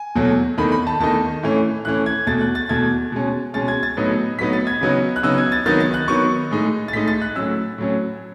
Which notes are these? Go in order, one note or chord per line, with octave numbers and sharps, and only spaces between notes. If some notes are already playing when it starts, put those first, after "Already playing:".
Already playing: G#5
E2 B2 F#3 A3
E2 D#3 A3 D#4 B5
B5
A5
E2 D#3 A3 D#4 A5
A2 E3 A3 C#4
A2 E3 A3 C#4 F#6
G#6
E2 B2 A3 A6
F#6
A6
E2 B2 A3 G#6
B2 G#3 C#4
B2 G#3 C#4 A6
G#6
A6
A2 F#3 B3 D#4
A2 F#3 B3 D#4 B6
A6
G#6
C#3 F#3 B3 D#4
F#6
C#3 F#3 B3 D#4 E6
G#6
A6
D#3 F#3 B3 D#4 A6
A6
F#6
D#3 F#3 B3 D#4 C#6
A2 G#3 D#4
A6
A2 G#3 D#4 B6
A6
F#6
A2 F#3 C#4 E6
A2 F#3 C#4